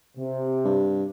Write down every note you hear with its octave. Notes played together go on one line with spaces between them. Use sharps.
C3
G2